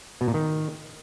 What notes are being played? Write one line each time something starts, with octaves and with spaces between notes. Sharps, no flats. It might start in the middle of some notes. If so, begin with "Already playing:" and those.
B2
A#2
D#3